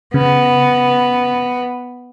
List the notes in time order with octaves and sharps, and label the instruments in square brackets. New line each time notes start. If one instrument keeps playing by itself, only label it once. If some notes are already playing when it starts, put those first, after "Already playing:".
[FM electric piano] C#3 [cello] B3